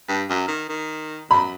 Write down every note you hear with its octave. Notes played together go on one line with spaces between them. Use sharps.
G2
F#2
D#3
D#3
F#2 B5